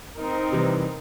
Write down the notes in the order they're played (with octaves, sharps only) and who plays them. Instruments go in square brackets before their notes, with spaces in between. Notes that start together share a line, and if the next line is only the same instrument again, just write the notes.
[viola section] C4 D#4 A#4
[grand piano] C3 E3 G3